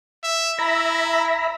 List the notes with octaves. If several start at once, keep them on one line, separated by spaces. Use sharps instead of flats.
E5
E4 E5 A#5 B5